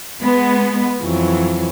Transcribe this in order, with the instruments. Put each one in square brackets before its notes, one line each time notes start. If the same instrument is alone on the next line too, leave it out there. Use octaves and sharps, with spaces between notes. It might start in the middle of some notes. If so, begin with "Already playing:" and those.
[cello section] G#3 B3
[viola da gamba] F2 E3 [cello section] F#3